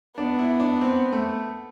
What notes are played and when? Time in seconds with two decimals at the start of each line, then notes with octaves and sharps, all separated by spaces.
0.18 B3 D4
0.39 E4
0.60 D4
0.81 C4
1.12 A3